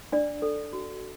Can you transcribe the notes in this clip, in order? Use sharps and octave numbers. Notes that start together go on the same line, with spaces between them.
D4 D5
A4
F#4